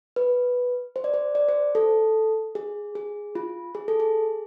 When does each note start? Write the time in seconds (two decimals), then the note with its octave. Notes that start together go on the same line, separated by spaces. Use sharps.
0.16 B4
0.96 C5
1.04 D5
1.14 C5
1.35 D5
1.49 C5
1.75 A4
2.55 G#4
2.95 G#4
3.35 F4
3.75 G#4
3.88 A4
4.00 G#4